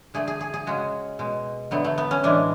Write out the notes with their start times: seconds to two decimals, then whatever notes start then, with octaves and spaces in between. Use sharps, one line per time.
0.14 D3 A3 G#4
0.28 G#4
0.41 G#4
0.54 G#4
0.67 C#3 G#3 F#4
1.19 B2 G#3
1.71 D3 F#3 A3 B3
1.84 A3
1.98 B3
2.11 C#4
2.23 A2 E3 G#3 D4